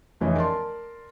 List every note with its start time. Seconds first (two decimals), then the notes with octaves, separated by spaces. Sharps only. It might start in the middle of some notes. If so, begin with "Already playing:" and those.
0.21 F1 E3 C#4 D#5
0.35 A#4 D5 A5 C6